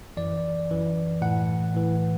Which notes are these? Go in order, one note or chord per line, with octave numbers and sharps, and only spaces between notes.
F#2 E3 D5
F#2 E3
A2 E3 F#5
A2 E3